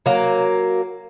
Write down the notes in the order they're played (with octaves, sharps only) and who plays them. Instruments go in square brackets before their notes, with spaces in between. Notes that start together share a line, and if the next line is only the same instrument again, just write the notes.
[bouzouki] F#3 A#3